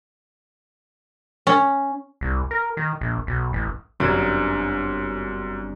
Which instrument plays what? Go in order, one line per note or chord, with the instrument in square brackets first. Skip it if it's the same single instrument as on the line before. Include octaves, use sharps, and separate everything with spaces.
[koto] C#4
[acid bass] C2
A#4
D#3
A#1
B1
A1
[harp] G1 C4 G#6 [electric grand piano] F#2